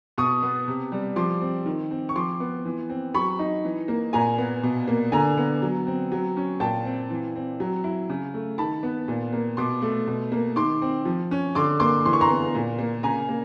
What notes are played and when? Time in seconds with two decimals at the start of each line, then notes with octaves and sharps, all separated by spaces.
0.18 B2 C#6 D#6
0.43 B3
0.68 C3
0.92 G3
1.16 F3 C6 D6
1.41 C4
1.66 D#3
1.91 C4
2.09 C#6
2.16 F3 C6 D6
2.40 B3
2.65 E3
2.90 C4
3.14 F#3 B5 C#6
3.39 D#4
3.65 E3
3.88 A#3
4.13 A#2 G#5 A#5
4.38 B3
4.63 B2
4.88 A#3
5.12 D3 G#5 A#5
5.37 B3
5.62 F#3
5.87 C4
6.12 F#3
6.37 C#4
6.60 A#2 G5 A5
6.85 C4
7.10 E3
7.36 C4
7.60 F#3
7.84 E4
8.09 C#3
8.34 A3
8.58 D#3 A5 B5
8.83 B3
9.08 A#2
9.33 A#3
9.57 B2 C6 D6
9.82 A3
10.07 B2
10.32 A#3
10.56 D#3 C6 D6
10.82 C4
11.05 F3
11.31 C#4
11.55 D3 C6 D6
11.80 A#3 C6 D6
12.05 E3 C6
12.13 C#6
12.21 A#5 C6
12.30 B3
12.54 A#2
12.79 A#3
13.03 C#3 G#5 A#5
13.29 A#3